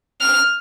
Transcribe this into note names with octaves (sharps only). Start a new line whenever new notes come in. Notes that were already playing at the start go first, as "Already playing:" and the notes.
F6